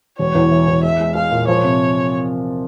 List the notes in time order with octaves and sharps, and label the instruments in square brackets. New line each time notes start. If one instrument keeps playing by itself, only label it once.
[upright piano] E1 [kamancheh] C#5
[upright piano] E2
E3
E2
[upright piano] G#3 [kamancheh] E5
[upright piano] G#3
[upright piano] G#3 [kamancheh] F5
[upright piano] A#2
[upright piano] F3 [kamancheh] C#5
[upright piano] C3